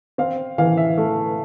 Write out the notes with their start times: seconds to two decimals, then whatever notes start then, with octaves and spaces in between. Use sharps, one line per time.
0.18 C4 F5
0.58 E3 F5
0.77 E5
0.97 A3